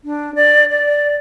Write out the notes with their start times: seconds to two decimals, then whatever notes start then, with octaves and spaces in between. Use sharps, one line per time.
0.04 D4
0.35 D5
0.70 D5